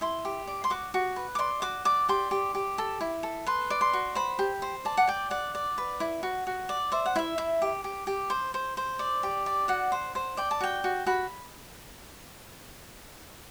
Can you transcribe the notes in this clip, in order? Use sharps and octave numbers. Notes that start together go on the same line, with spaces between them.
E4 C6
G4
D5
C6
F#4 D6
F#4
B4
D6
D5 C6
F#4 D6
D5 D6
G4 C6
G4
G4
A4
E4
A4
B4 C6
D5
C6
F#4
C5 B5
G4
C5
D5 A5
F#5
D5 G5
D5 F#5
D5
B4
E4
F#4
F#4
D5
C5 E5
F#5
E4 E5
E4
G4
G4
G4
C5
C5
C5
D5
G4
D5
F#4 F#5
C5
C5
D5 G5
A5
F#4 G5
F#4
F#4 B5